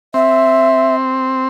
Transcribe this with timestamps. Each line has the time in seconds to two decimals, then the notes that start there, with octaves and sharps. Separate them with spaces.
0.14 C4 E5